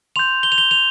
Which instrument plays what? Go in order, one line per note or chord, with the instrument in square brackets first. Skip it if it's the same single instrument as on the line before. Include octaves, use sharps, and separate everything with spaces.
[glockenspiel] C6 G6 F7
G7
F7
G7
F7